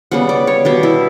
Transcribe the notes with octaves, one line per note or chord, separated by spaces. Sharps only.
C#3 G3 B3 F#5
D5
C#5
B2 G3 B3 D4
E4